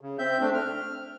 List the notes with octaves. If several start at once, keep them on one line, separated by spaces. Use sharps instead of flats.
C#3
C4 E5 G6
A3 C4 D4
F6